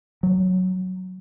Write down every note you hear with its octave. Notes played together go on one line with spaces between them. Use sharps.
F#3